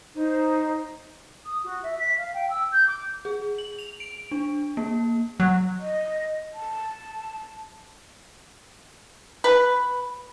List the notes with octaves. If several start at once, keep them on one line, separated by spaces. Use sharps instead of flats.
D#4 C5
D#6
F#4
E5
B6
F5
G5
E6
G6
D6
G#4
F#7
F7
D7
D4
A#3
F#3
D#5
A5
B4